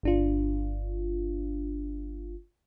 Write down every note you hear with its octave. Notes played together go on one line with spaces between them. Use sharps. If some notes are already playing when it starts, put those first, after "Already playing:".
G1 D4 F4